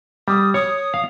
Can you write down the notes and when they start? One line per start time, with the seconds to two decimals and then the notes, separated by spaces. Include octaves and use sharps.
0.28 G3 D#6
0.54 C#5 D#6
0.94 F5